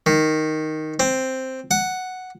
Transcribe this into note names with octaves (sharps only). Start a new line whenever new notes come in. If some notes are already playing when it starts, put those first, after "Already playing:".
D#3
C4
F#5